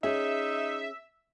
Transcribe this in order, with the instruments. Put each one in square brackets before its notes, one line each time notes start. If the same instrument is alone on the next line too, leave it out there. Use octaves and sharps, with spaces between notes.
[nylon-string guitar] C#4 G#4 [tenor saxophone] D#4 [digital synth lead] E5